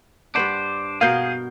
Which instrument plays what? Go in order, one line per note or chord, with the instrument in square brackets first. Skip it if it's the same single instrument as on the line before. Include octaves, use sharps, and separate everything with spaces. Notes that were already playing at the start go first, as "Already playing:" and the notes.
[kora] G2 B4 F#5 [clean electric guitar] D4 C5
[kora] B2 B3 A#4 [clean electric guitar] G#4 [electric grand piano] F5 G6 C7